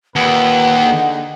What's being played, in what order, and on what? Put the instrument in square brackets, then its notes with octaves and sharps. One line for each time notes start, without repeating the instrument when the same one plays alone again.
[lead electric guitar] D#2 [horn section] A#2 B4 [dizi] F#5
[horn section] D3 D#4 G#4